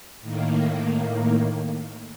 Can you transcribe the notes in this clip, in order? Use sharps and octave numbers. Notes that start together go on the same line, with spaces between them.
A2 D#3 A#3